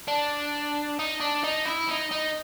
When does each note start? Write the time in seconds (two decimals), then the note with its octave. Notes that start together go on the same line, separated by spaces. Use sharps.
0.08 D4
0.99 D#4
1.21 D4
1.44 D#4
1.66 E4
1.89 D#4
2.11 D#4